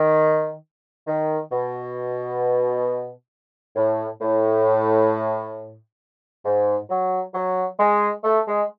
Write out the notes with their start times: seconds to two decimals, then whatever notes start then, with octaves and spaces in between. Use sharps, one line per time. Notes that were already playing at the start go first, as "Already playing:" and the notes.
Already playing: D#3
1.07 D#3
1.52 B2
3.76 A2
4.21 A2
6.45 G#2
6.90 F#3
7.34 F#3
7.79 G#3
8.24 A3
8.47 G#3